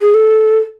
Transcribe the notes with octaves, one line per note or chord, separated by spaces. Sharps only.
G#4
A4